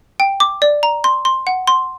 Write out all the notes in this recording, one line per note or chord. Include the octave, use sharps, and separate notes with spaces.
G5
D6
D5
A#5
C6
C6
F#5
C6